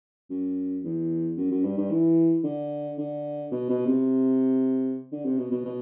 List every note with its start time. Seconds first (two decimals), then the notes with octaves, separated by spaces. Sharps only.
0.30 F#2
0.84 E2
1.37 F#2
1.51 F#2
1.64 G2
1.78 G2
1.91 E3
2.44 D3
2.98 D3
3.51 B2
3.69 B2
3.86 C3
5.12 D3
5.25 C3
5.38 B2
5.51 B2
5.65 B2